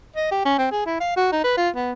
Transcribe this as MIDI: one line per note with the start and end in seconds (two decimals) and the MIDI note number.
0.16 0.31 75
0.32 0.44 67
0.46 0.56 61
0.58 0.69 60
0.72 0.85 68
0.86 0.97 64
1.00 1.12 77
1.16 1.27 66
1.32 1.43 63
1.44 1.57 71
1.57 1.69 65
1.76 1.92 59